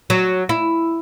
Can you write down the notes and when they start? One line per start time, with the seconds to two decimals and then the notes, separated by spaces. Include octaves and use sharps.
0.10 F#3
0.49 E4